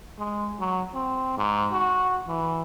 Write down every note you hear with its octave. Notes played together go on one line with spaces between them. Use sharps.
G#3
F#3
C4
G#2
F#4
E3